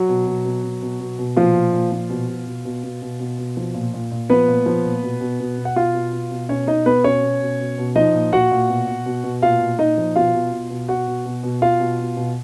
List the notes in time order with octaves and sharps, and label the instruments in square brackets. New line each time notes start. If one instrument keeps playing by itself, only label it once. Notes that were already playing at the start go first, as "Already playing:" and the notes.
Already playing: [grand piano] F#3 F#4
B2
B2
B2
B2
B2
B2
B2
A#2 F3 F4
A#2
A#2
F3
B2
B2
B2
B2
B2
B2
B2
B2
F3
A#2
A#2
A#2
F3 B3 B4
A#2
F3
A#2
B2
B2
B2
B2
F#5
B2 F4 F5
B2
B2
B2
B2 C#4 C#5
B2 D#4 D#5
B2 B3 B4
B2 C#4 C#5
B2
B2
B2
B2
F3 D#4 D#5
A#2
A#2 F#4 F#5
A#2
B2
B2
B2
B2
A#2 F4 F5
A#2
A#2 D#4 D#5
F3
B2 F4 F5
B2
B2
B2
B2 F#4 F#5
B2
B2
B2
B2 F4 F5
B2
B2
B2